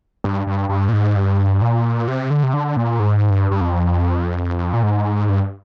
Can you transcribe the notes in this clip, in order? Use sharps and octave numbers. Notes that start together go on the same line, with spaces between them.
G2
G2
G2
A#2
G#2
G2
A#2
C3
D3
C3
D3
A#2
G#2
G2
G2
F2
A#2
G#2
G2